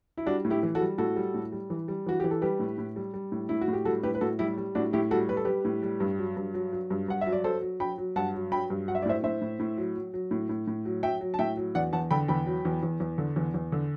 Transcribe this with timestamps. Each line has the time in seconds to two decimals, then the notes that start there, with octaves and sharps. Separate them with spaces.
0.17 E4
0.26 G3 D4 F#4
0.45 A2
0.50 E4 G4
0.63 E3
0.75 F#4 A4
0.81 G3
0.98 A2 F#4 A4
1.16 G3
1.34 A2
1.52 G3
1.70 E3
1.88 G3
2.06 E3 F#4
2.20 E3 G4
2.31 A4
2.42 G3 G4 B4
2.60 A2
2.78 A2
2.96 G3
3.14 G3
3.32 A2
3.49 A2 E4
3.61 F#4
3.68 A2
3.73 G4
3.85 G3 F#4 A4
4.03 A2 G4 B4
4.15 B4
4.21 A2 F#4 A4
4.39 G3 E4 G4
4.58 G3
4.75 A2 D4 F#4
4.93 A2 E4 G4
5.11 G3 F#4 A4
5.29 G3 B4
5.37 A4
5.45 G3 G4 B4
5.65 A2
5.83 G3
6.00 G2
6.19 F#3
6.37 G2
6.54 F#3
6.73 F#3
6.90 G2
7.08 G2 F#5
7.21 E5
7.26 F#3
7.33 D5
7.44 F#3 A4 C5
7.62 F#3
7.80 F#3 G5 B5
7.98 F#3
8.16 G2 F#5 A5
8.34 F#3
8.52 F#3 G5 B5
8.70 G2
8.88 F#3 F#5
8.95 E5
9.02 D5
9.06 A2 C5 E5
9.23 A2 C5 E5
9.42 A2
9.60 A2
9.77 F#3
9.96 F#3
10.14 F#3
10.31 A2
10.49 A2
10.67 A2
10.85 F#3
11.03 F#3 E5 G5
11.21 F#3
11.34 A5
11.39 A2 E5 G5
11.57 F#3
11.75 E2 D5 F#5
11.93 E2 F#5 A5
12.11 D3 G5 B5
12.28 E2 G5 B5
12.47 F#3
12.65 E2
12.83 E2
13.00 E2
13.18 D3
13.36 E2
13.54 E2
13.72 D3